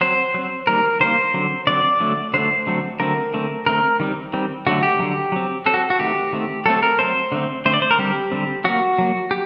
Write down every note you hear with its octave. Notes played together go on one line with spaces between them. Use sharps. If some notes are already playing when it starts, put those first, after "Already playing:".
F#3 C4 C5
F#3 C4
D#3 G3 A#3 A#4
D#3 G3 A#3 C5
D3 F#3 C4
D3 F#3 C4 D5
D3 F#3 A3
D3 F#3 A3 C5
D3 F#3 A3 C4
D3 F#3 A3 C4 A#4
D3 A3 C4
D3 A3 C4 A#4
D#3 G3 C4
D#3 G3 C4
D3 F#3 A3 F#4
G4
D3 F#3 A3
F#3 C4
F#3 C4 A4
F#4
F#4
D#3 A3 C4 G4
D#3 A3 C4
F#3 A3 C4 A4
A#4
F#3 A3 C4 C5
D3 A3 C4
D3 A3 C4 C5
D5
C5
A#4
D3 G3 C4 G4
D3 G3 C4
F#3 A#3 F#4
F#3 A#3
G4